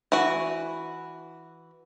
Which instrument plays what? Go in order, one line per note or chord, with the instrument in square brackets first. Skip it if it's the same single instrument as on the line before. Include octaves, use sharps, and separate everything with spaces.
[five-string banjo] E3 F#4